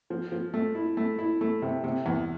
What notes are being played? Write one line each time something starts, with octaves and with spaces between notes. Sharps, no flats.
F3
F3
A3
E4
A3
E4
A3
C3
C3
E2